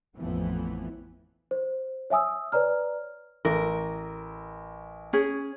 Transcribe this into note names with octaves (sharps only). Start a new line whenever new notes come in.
A1 F2 A2 E3 F3 B3
C5
C#5 E5 G#5 D#6 E6
B4 C#5 D5 A#5 F6
A1 A#4
C#4 G#4